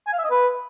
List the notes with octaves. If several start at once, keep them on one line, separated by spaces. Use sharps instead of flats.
G#5
F5
E5
D#5
B4